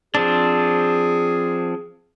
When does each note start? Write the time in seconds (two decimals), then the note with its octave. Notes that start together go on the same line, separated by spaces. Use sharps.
0.15 F3 C4 D4 G#4